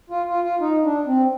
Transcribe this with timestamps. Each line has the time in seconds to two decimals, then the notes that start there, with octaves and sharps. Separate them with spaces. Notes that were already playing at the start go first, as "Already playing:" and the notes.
0.10 F4
0.28 F4
0.44 F4
0.60 D#4
0.84 D4
1.06 C4